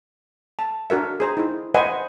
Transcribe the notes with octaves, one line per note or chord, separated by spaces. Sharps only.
A5
D4 F#4 A#4 E5
G#4 C5 A#5
D#4 E4
B4 C5 D#5 E5 F#5 G#5